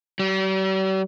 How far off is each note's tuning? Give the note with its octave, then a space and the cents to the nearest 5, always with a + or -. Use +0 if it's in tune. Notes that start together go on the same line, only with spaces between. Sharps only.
G3 -45